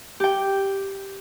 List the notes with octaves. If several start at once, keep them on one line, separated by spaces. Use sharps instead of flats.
G4 G5